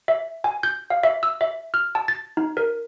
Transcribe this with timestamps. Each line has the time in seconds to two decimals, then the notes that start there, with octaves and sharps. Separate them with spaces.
0.08 E5
0.44 G#5
0.63 G6
0.90 F5
1.03 E5
1.23 E6
1.41 E5
1.74 F6
1.95 A5
2.08 A6
2.37 D#4
2.57 A#4